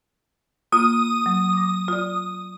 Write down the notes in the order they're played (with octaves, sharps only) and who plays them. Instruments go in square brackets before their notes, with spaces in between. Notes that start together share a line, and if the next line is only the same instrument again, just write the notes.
[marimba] A#3 F4 [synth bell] D#6
[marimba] F#3
D6 A#6
F4 D5